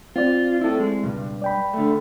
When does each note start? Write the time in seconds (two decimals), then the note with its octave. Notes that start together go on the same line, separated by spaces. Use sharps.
0.16 C4 F4 D5
0.61 E4 A4
0.79 G#3
1.03 C#2 G2 B2
1.42 D5 G5 B5
1.74 D3 A3